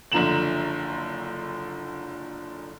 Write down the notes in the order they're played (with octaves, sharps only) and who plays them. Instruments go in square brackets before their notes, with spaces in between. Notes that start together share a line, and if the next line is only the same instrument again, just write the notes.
[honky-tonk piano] F#1 D3 F3 A#5 E7 F#7